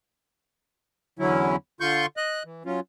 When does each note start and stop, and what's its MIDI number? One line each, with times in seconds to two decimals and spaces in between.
1.19 1.56 40
1.19 1.56 50
1.19 1.56 54
1.19 1.56 61
1.19 1.56 64
1.80 2.06 50
1.80 2.06 65
1.80 2.06 84
1.80 2.06 85
1.80 2.06 91
2.17 2.43 75
2.17 2.43 90
2.45 2.63 52
2.65 2.80 54
2.65 2.80 61
2.65 2.80 65